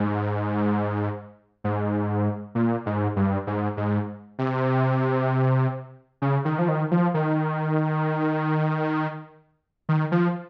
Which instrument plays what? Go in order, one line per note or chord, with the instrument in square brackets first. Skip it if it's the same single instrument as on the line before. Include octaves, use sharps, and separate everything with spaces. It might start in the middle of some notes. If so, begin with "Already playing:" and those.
Already playing: [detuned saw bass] G#2
G#2
A#2
G#2
G2
G#2
G#2
C3
C#3
D#3
F3
D#3
F3
D#3
D#3
F3